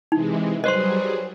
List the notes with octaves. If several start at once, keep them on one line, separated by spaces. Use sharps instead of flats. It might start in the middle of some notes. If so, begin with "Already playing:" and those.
C3 E3 G#3 D#4
F#3 G3 G#4 B4 C5 D#5 C6